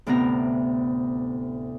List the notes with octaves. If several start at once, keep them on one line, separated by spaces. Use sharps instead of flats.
D2 A2 C3 B3 E4 A#5